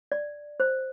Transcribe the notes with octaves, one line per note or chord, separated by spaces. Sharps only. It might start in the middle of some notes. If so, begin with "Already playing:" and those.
D5
C5